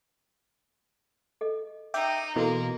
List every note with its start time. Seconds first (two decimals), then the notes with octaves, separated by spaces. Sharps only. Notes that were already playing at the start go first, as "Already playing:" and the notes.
1.41 A4 D#5
1.94 D#4 E5 G5 D6
2.36 B2 E3 A#3 F#4 A4 D#5